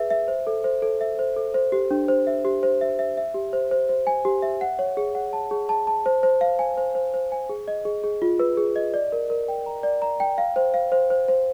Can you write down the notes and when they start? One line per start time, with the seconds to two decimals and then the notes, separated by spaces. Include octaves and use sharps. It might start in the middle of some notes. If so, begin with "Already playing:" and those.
Already playing: G#4 B4 E5
0.10 E5
0.28 C5
0.47 A4
0.64 C5
0.82 A4
1.01 E5
1.19 C5
1.36 A4
1.54 C5
1.72 G4
1.91 D4
2.08 C5
2.27 E5
2.45 G4
2.63 C5
2.81 E5
2.99 E5
3.17 E5
3.34 G4
3.53 C5
3.71 C5
3.89 C5
4.07 G#5
4.25 G4
4.42 E5
4.61 F#5
4.79 C#5
4.97 G#4
5.15 F#5
5.33 A5
5.51 G#4
5.69 A5
5.87 A5
6.06 C5
6.23 C5
6.41 F5
6.59 G#5
6.77 C5
6.95 C5
7.14 C5
7.32 G#5
7.49 G#4
7.68 D#5
7.85 G#4
8.04 G#4
8.22 F4
8.39 B4
8.57 G#4
8.76 D#5
8.94 D5
9.12 A#4
9.30 A#4
9.48 G5
9.66 A#5
9.83 D5
10.02 A#5
10.20 G5
10.38 F5
10.56 C5
10.74 F5
10.92 C5
11.10 C5
11.28 C5